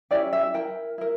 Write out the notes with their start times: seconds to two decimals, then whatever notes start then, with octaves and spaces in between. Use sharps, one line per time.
0.11 C#4 E4 G4 D5
0.33 E5
0.54 E4 A#4 G5
0.98 E4 A#4